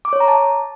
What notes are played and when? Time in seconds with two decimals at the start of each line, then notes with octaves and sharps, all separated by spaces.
0.05 D6
0.13 C#5
0.20 A#5
0.28 A5